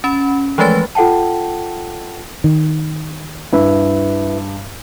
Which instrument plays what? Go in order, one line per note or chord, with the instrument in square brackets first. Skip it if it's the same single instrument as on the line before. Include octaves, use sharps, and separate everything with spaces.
[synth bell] C#4 B5
E3 F3 G#3 A3 B4 A6
[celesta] F4 A4 F#5 G5 A5
[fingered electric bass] D#3
[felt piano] G2 [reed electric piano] E4 B4 E5